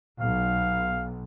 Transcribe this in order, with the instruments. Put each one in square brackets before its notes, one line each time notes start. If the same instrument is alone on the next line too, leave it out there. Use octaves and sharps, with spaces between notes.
[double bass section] B1 [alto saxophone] F5